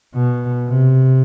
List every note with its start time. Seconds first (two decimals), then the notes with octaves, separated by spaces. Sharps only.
0.15 B2
0.68 C3